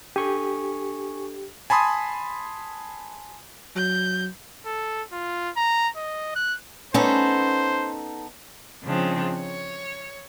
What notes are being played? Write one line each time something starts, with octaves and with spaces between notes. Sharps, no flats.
D4 G4 A4 G#5 C#6
G#5 A5 B5 C6 D#6
F#3 G6
A4
F4
A#5
D#5
F#6
B3 C#4 D#4 A4 C5
C#3 F3 G#3 C4 D4
C#5